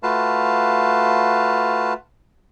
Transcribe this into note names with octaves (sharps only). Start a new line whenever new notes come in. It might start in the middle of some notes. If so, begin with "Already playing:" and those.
A3 F4 F#4 B4 F5 A5